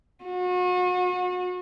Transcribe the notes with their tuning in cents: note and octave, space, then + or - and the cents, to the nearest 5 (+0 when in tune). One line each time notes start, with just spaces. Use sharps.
F#4 -40